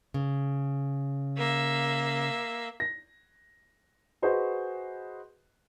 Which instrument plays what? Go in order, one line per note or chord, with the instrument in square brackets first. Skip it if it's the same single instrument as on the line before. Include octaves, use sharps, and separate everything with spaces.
[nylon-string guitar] C#3
[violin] A#3 E5
[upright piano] A#6
F#4 G#4 B4 C5 D#5